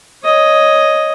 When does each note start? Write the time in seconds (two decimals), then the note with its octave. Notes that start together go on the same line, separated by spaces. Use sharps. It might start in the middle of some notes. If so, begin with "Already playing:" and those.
0.24 C#5 D#5